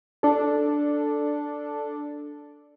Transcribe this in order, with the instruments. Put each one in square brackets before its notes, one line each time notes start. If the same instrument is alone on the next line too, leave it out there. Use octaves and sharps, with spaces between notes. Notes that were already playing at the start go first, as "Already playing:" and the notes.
[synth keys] D4 A4